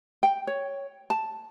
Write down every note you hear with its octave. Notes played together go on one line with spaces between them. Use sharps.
G5
C#5
A5